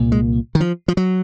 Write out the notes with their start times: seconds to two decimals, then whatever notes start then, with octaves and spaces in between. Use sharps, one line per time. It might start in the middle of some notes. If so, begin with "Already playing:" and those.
Already playing: C2 A#2
0.12 G#3
0.55 D#3
0.60 F3
0.88 F3
0.97 F#3